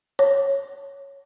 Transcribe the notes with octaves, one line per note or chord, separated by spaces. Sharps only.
C#5